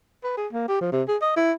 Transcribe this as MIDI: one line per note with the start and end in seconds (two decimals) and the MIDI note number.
0.24 0.34 71
0.37 0.47 68
0.52 0.66 58
0.68 0.80 67
0.81 0.91 53
0.92 1.02 48
1.08 1.17 68
1.22 1.34 75
1.36 1.52 64